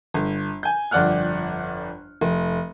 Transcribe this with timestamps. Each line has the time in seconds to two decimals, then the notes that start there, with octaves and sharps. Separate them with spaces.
0.14 G1
0.63 G#5 G6
0.91 G1 F2 D5 F#5 F6 F#6
2.21 F1